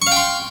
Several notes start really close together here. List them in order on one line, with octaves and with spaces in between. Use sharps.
C#6 F5 G5 C6